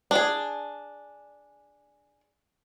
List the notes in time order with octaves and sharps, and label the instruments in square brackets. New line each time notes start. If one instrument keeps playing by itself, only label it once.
[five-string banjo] D4 G#4